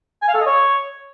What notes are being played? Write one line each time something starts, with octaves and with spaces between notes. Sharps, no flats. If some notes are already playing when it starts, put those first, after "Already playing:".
G#5
F5
A4
D#5
C#5